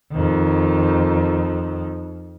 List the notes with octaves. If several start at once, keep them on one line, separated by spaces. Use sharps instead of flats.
F2 D#3